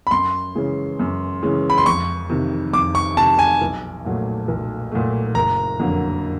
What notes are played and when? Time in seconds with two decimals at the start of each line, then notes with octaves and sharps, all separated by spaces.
0.07 B5
0.11 F#2 C6
0.55 C#3 E3 G#3 C#4
0.99 F#2
1.43 C#3 E3 G#3 C#4
1.70 B5
1.78 C6
1.86 F2 C#6
2.29 C3 D#3
2.73 F2 D6
2.95 C#6
3.17 C3 D#3 A5
3.39 G#5
3.61 B1
4.05 A#2 F#3 A3
4.48 B1
4.92 A#2 F#3 A3
5.35 F#1 A#5
5.80 F2 D3 F#3 A#3